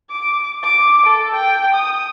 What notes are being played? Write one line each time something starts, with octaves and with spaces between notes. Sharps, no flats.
D6
D6
A4
G5
D#6